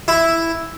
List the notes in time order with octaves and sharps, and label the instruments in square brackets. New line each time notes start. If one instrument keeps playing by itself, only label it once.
[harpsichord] E4